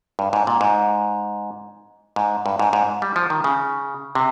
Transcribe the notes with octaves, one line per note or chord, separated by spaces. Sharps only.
G2
G#2
A#2
G#2
G#2
G2
G#2
G#2
G3
F3
D#3
C#3
C3